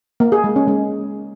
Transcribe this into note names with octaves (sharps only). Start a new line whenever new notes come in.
A#3
G#4
G#3
C#4
G#3